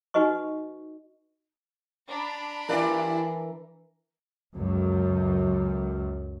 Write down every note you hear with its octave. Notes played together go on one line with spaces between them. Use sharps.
D#4 F#4 B4 D#5 C#6
D4 A#5 B5
G2 E3 E4 A#4 D5
C#2 F#2